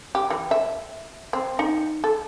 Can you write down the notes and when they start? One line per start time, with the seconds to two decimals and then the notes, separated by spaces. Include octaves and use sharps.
0.15 G4
0.30 E3
0.51 E5
1.33 C4
1.59 D#4
2.04 A4